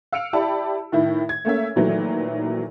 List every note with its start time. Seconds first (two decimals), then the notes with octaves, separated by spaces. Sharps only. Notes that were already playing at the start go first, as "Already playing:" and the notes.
0.13 F5 E6 C#7 D7 F7
0.33 E4 G4 D5 A5 B5
0.92 A2 D#3 E4
1.29 G#6
1.45 A3 A#3 C#4 E5
1.76 A#2 D#3 E3 F#3 A3